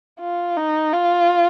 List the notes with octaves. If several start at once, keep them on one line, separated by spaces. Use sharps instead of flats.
F4
D#4
F4